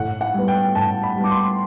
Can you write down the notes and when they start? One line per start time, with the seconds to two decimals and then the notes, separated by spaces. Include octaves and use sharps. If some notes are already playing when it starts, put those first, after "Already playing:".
Already playing: A2 F#5
0.21 F#5
0.34 G3 B3
0.48 G5
0.75 A2 A5
1.03 B5
1.16 G3 B3
1.24 D6
1.31 C6